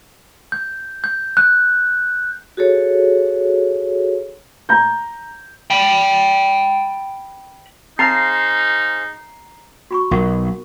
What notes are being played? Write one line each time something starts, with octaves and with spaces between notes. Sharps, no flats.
G6
G6
F#6
F#4 G#4 A4 C#5
A#5 G6
G5 B5
C4 D#4 G#4 C5 F5 A#5 C7
F#4 B5 C#6
B1 F4 A#4